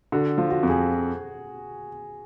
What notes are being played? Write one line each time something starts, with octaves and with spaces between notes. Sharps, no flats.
D3 F#4
F3
F#4
F2
G#4